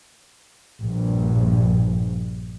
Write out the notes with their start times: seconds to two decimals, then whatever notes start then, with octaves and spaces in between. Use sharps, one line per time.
0.81 A#1 G2